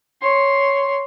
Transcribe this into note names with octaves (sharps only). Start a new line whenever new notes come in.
C#5 C6